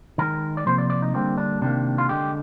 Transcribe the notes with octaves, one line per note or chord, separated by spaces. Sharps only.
D#3 G#3 A#4
D5
C3 F3 A#3 C5
D5
D5
D#4
D3 G3 A#3 C4
D4
C3 D#3 A#3 D4
F4
D3 G#3 G4